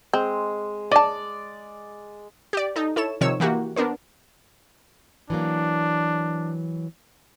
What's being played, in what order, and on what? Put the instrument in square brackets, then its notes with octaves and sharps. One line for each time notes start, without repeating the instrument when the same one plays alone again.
[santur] G#3 [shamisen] C4
[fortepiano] D5 [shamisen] D#5 A5
[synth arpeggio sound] G4 D5
D#4 A4
E4 A4 C#5 E7
C3 D#3 F3 C#5 E6
E3 A#3 F#4 G4
B3 D4 A#4 C5
[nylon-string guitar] E3 F#3 A#3 [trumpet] D4